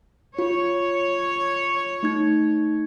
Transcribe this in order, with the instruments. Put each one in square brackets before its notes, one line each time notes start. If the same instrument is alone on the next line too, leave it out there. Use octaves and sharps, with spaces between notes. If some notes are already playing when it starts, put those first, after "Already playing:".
[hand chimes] F4 [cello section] C#5
[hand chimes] A3 D#4 G#6